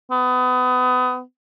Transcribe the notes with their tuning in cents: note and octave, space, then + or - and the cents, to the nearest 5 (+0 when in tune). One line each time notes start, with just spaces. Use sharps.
B3 +30